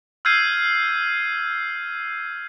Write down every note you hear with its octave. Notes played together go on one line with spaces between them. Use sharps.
E6 F6 G6 G#6 C7 D#7